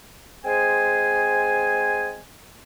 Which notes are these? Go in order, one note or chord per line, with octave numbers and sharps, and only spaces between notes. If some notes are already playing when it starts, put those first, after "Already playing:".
G#3 C4 G#4 C5 G#5